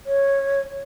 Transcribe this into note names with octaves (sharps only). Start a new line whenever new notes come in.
C#5